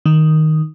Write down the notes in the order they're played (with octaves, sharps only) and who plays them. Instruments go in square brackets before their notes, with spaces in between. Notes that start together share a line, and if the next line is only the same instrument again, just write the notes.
[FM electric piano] D#3